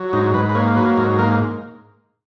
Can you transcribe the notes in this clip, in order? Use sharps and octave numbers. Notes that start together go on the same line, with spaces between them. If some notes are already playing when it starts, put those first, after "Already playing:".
Already playing: F#3
G#2 D#4
G#2 B4
B4
A#3 C#5
F#3 B4
G#2 A#4
A#3 A#4